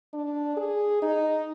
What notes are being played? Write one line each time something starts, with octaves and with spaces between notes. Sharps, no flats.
D4
G#4
D#4